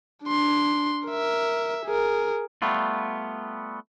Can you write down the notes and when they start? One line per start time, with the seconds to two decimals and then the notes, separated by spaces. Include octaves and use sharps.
0.24 D4 C6
1.08 A#4 E5
1.86 G#4 A#4
2.62 G3 A3 B3 F4